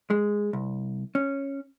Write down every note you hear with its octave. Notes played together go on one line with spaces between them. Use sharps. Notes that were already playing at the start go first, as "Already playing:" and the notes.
G#3
C2
C#4